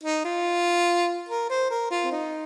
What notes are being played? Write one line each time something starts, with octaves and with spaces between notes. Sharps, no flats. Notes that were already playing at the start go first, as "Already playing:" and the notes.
D#4
F4
A#4
C5
A#4
F4
C4
D#4